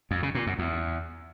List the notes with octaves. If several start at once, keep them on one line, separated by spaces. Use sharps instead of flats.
F2
C#3
A#2
F#2
E2